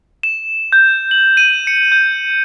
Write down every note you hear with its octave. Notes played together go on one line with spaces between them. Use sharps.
E7
G6
F#7
D#7
C#7
G6